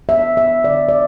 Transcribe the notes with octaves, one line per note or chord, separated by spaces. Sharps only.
B3 E5
B3 E5
D3 D5
D5